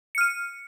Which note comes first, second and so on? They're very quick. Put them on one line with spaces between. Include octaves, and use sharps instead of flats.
C#7 F6 D#7